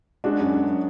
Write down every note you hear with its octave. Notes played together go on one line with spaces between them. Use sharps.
G#3 D4 F#4
F#2
F#2